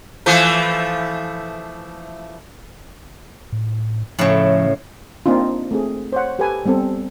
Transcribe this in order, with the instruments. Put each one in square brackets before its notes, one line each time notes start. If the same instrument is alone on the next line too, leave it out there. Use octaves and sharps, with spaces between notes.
[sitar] E3 F3 A3
[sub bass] A2
[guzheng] A2 C#3 [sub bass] F3
[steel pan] A#3 C4 D4 D#4 F4
A3 C4 G#4
C5 C#5 F#5
G4 A4 B4 G5 G#5
G3 B3 C4 A4